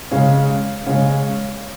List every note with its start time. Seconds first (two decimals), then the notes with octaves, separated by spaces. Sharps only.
0.11 C#3 G#3 C#4 C#5 F5
0.86 C#3 G#3 C#4 C#5 F5